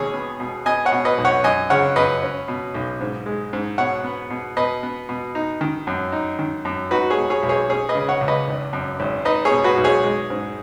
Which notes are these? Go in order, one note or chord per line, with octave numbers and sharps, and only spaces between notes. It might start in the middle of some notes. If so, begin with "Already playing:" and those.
Already playing: D#2 B2 G#4 C#5
B3
B2
B3 D#5 G#5
C#5 F#5
B2
B4 D#5
B1
C#5 F#5
F#2 D#5 G#5
C#3 C#5 F#5
F#2 B4 D#5
C#4
B2
B1
G#2
G#3
G#2
B2 C#5 F#5
B3
B2
B2 B4 D#5
B3
B2
D#4
D#3
F#2
D#4
D#3
F#2
D#4 F#4 B4
G#4 C#5
B2
G#4 C#5
B1
G#4 C#5
C#4 G#4 C#5
B4 D#5
C#3
C#5 F#5
C#2
B4 D#5
G#1
F#2
G#1
D#4 B4 D#5
G#4 C#5
B2
F#4 B4
B1
G#4 C#5
G#3
G#2